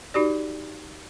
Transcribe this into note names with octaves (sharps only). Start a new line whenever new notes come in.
D#4 F#4 G4 D5